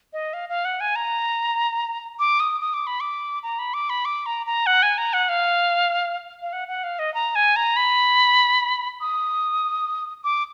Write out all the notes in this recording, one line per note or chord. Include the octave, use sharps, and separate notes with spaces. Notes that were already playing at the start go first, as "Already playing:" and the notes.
D#5
F5
F5
F#5
G#5
A#5
D6
D#6
D#6
D6
B5
D6
A#5
B5
D6
B5
D6
A#5
A#5
F#5
G#5
A#5
F#5
F5
F5
F#5
F#5
F5
D#5
A#5
G#5
A#5
B5
D#6
D6